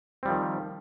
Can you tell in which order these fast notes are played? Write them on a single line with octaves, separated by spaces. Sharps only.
C4 G3 F3 D#3